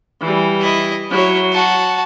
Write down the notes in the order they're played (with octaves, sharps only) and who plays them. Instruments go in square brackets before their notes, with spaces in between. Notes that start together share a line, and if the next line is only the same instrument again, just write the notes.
[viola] E3 G3
[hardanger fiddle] E4 D#5
[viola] F#3 [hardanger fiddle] E4 C#5
[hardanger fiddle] F#4 A5